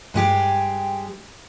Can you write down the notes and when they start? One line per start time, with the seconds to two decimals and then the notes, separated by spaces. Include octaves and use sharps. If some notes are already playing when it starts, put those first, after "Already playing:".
0.14 G2 G#3 G4 G#4